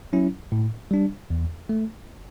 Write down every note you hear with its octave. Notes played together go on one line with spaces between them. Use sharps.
F#3 C#4 E4
A2
G3 D4
E2
A3